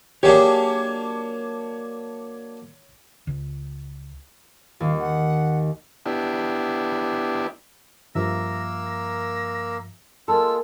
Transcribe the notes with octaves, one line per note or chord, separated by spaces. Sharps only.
F#3 A#3 D4 G4 G#4 C#5
C#2
D#2 F5
F#5
B3 D4 E4 G4
G2 F3 A#3 A#4 E5 E6 A#6
A#6
G#3 A#3 F4 A4 E6